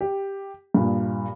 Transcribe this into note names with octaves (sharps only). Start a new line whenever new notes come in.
G4
G2 A#2